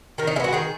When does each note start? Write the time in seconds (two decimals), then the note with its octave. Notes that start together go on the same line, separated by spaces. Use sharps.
0.18 D#3 A#4
0.27 D#4
0.36 G#3 E4
0.40 B3 F#4
0.52 D#3 G#4